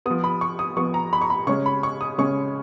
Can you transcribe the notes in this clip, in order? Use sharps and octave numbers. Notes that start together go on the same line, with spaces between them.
F3 B3 D#6
B5
C#6
D#6
F3 B3 C#6
A#5
B5
C#6
B5
C#3 G#3 C#4 C#6
B5
C#6
D#6
C#3 G#3 C#4 C#6